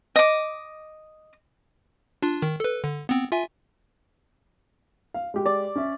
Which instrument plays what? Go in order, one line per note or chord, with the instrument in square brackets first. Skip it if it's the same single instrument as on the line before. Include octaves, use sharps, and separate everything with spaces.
[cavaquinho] D#5 D6
[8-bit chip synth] D4 F4
D#3
A4 B4
D3
B3 C4
F4 E5 G#5
[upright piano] F5
G#3 G4
[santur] D5
[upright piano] C#4 E5